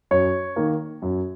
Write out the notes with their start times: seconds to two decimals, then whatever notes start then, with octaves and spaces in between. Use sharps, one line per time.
0.11 F#2 C#5
0.56 D#3 A#3
1.02 F#2